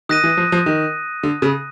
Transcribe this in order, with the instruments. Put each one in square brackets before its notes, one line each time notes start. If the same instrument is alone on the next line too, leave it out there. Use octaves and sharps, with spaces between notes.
[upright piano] D#3 [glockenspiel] D#6 F#6 A#6 D#7
[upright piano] E3
F3
F3
D#3
D3
C#3